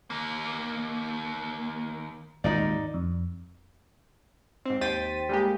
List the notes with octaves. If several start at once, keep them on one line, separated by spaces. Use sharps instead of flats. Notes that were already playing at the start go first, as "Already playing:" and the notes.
D#2 A#3
G#1 D#2 A#2 D#4 D5
F2
G#2 C4
D#2 C5 G5 A6 B6 D#7
G3 G#3 A#3 G4